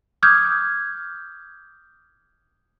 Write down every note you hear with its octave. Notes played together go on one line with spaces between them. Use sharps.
D6 D#6 F6 G6 G#6